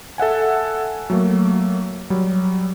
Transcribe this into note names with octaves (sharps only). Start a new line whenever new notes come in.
A4 E5 F#5 G#5
F#3 A3 A#3
F#3 G3